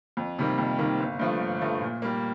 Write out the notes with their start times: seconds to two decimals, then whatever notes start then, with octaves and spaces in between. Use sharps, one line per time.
0.17 F2
0.39 C3 D#3 G3 A#3
0.58 F2
0.78 C3 D#3 G3 A#3
1.00 G1
1.19 G2 F3 A3
1.40 G1
1.61 G2 F3 A3
1.81 A#2
2.02 G3 A#3